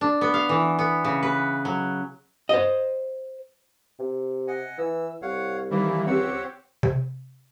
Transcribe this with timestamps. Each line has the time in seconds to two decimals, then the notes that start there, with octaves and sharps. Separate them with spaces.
0.01 D4
0.21 B3
0.34 F5
0.49 E3
0.79 B3
1.04 C#3
1.23 B4
1.65 F#3
2.49 C5 D#5
3.99 C3
4.47 D#5 F#5 G#5
4.78 E3 E6
5.22 C2 C#5 F5 F#5
5.71 D#3 E3 G3 A#3 E4 E5
6.06 C#2 C4 G4 C#5 F#5 E6
6.83 C3